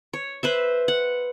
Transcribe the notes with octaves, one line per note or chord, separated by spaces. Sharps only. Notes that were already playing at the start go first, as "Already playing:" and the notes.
C#5
B4 C5 E5
F#5